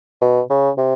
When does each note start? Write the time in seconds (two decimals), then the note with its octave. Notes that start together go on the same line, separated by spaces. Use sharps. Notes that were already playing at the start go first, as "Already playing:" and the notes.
0.21 B2
0.50 C#3
0.78 C3